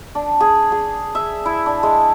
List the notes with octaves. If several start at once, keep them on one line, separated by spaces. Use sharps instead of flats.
D4
G#4
G#4
E5
E4
D4
G#3